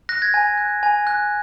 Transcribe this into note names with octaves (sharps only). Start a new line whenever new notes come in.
F#6 A#6
G#6
G#5
F#6
G#5
F#6